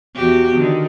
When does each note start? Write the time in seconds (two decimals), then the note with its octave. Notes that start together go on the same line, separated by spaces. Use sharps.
0.16 E2 F#4 G4
0.56 D3 D#3